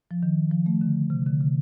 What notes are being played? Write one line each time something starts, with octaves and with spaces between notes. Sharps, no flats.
F3
D#3
F3
A3
D3
C3
D3
C3